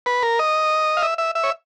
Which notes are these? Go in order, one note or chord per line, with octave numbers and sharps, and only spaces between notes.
B4
A#4
D#5
F5
E5
E5
E5
C#5